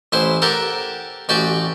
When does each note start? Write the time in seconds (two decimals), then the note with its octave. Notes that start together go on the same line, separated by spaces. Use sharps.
0.12 A1 E4 B4 C5
0.42 G4 A4 A#4 F#5 G5
1.29 A1 F#4 G4 D5 G5 C#6